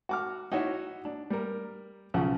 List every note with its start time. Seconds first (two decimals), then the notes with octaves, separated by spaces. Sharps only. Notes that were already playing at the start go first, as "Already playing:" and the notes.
0.09 F#4 D6 F6
0.52 D#4 E4 F#4 C#5 E5
1.05 D4
1.30 G3 A#4
2.14 B1 C#3 F3 F#5